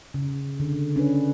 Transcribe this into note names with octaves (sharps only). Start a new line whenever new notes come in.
C#3
D3
C#4 D4 B4